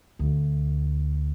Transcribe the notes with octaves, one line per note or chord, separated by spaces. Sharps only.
D2